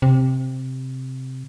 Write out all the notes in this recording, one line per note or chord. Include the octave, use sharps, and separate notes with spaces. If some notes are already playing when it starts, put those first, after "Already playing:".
C3